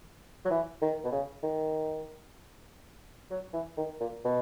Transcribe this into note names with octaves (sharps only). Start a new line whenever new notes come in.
F#3
E3
D#3
B2
C#3
D#3
F#3
E3
D#3
A#2
B2